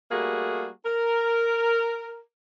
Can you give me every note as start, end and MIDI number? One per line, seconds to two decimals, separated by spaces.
0.11 0.68 55
0.11 0.68 57
0.11 0.68 58
0.11 0.68 66
0.11 0.68 68
0.86 2.21 70